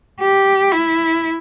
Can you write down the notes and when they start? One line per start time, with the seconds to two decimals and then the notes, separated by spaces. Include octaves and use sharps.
0.20 G4
0.71 E4